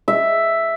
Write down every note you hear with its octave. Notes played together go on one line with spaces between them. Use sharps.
E5